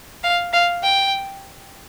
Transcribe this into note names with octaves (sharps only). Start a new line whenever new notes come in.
F5
F5
G5